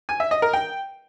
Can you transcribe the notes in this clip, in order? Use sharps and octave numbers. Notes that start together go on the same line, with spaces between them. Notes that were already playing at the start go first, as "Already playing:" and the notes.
G#5
E5
D#5
A#4
G5